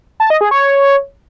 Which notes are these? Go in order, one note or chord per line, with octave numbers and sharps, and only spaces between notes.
A5
D#5
G#4
C#5